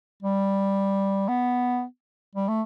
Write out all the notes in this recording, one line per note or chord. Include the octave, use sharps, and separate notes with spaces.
G3
B3
G3
A3